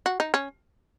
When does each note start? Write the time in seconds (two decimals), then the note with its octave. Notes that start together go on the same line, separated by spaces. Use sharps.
0.06 F#4
0.20 D#4
0.34 C#4